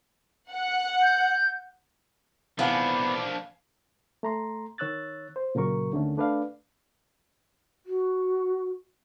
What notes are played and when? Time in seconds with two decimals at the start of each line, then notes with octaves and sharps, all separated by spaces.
0.50 F#5
1.01 G6
2.59 G#2 C3 E3 F3 B3 D4 F5 G#5
4.23 A3 A#5 C6
4.78 D#3 C#5 E6 F#6 A6
5.36 C5
5.55 A#2 C#3 F#3 A#4 C#6
5.92 D2 D3 D#3 A3 C#4
6.17 A3 D4 B4 D5 F5
7.86 F#4